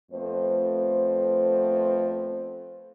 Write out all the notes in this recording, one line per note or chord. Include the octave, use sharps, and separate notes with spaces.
F2 A3 B3 C5